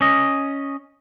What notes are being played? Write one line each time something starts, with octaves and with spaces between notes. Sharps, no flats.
C#4 D#5